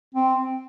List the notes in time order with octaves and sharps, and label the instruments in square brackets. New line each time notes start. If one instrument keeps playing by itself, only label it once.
[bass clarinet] C4